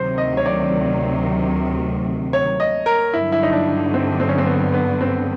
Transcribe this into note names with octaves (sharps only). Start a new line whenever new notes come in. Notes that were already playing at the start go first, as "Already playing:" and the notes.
Already playing: D2 C3 D#3 F#3 C5
D#5
C#5
D5
C#5
D#5
A#4
G2 D3 F#3 E4
E4
D#4
D4
C4
C4
C#4
C4
B3
B3
C4